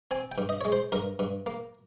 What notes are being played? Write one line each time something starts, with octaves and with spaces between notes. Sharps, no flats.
C4 G#5
G5
G2
D#5
G#3 C#5
C5
G2 A#4
G2
A#3